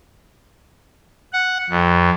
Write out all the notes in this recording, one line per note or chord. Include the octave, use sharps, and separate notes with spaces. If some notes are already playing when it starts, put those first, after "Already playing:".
F#5
F2